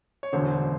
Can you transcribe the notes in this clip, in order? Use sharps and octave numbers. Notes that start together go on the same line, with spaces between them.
C#5
E1 D2 D3 C5